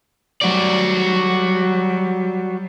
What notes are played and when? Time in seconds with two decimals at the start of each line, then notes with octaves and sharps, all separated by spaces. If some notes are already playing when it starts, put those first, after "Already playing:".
0.41 F#3 G3 F#4 D5